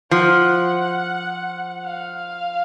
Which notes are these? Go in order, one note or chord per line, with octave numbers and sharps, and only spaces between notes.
F3 F#5
F5